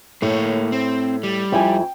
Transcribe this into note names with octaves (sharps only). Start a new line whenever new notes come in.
A2 A#3 C#5
C4
G3
F2 E4 G5 G#5